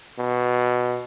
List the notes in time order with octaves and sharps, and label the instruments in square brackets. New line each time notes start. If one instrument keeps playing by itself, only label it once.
[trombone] B2